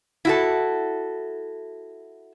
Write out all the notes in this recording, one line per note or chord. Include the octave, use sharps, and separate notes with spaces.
E4 F#4 A4